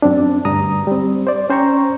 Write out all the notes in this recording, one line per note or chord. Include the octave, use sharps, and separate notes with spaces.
F#2 C4 D4
D2 G2 A#5 D#6
G3 C4
C5 D5
C#4 C5 G5 A#5 C#6